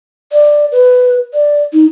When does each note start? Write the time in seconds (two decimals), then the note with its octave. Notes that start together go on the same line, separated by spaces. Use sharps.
0.32 D5
0.72 B4
1.33 D5
1.73 D#4